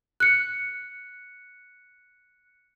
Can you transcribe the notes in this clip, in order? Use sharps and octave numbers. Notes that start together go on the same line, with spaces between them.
F#6 C#7